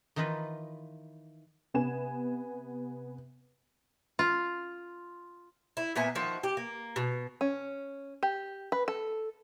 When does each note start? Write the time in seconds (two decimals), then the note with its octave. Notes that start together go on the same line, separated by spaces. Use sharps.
0.16 D#3 E3 D#4 F4 B4
1.74 C3 B3 G#5 E7
4.19 F4
5.77 E4
5.95 A#2 B3 E5 G#5
6.15 D#3 F3 F#4
6.43 G4
6.57 A#3
6.96 B2
7.41 C#4
8.23 G4
8.72 B4
8.88 A4